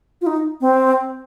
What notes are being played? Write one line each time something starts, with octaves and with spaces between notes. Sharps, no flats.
F4
D#4
C4